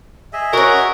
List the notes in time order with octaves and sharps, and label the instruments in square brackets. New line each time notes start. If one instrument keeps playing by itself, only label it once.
[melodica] G#4 D#5 E5
[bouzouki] C#4 F#4 [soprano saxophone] A#4